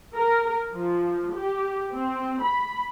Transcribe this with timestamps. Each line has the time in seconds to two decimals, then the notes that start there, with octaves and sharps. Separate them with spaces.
0.16 A#4
0.73 F3
1.34 G4
1.94 C4
2.44 B5